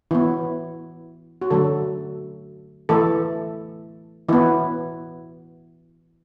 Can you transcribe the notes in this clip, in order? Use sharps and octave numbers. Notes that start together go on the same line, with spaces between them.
E3 B3 E4
F#4
D3 F#3 A3 A4
E3 A3 A4
E3 B3 E4